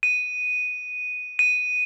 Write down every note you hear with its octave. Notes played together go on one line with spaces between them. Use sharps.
D#7
D#7